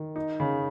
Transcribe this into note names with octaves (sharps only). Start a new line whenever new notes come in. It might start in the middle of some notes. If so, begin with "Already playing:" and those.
Already playing: D#3
D#4
C#3